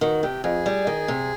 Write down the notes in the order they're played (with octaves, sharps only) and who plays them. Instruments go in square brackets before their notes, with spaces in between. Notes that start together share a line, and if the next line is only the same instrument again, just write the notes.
[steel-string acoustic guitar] D#3 [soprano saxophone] F#4
[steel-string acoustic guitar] C3 [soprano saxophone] G4
[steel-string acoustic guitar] F2 [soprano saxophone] G#4
[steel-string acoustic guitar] G3
D#3
C3